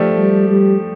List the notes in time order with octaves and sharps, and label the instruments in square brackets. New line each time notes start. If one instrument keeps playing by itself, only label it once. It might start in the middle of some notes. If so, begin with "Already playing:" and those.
Already playing: [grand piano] F3 A3 D4 G4
[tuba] G3
G3